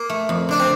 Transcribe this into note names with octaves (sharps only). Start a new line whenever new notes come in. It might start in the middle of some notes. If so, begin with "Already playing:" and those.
Already playing: A#3
A3
F2
D3 D4
C4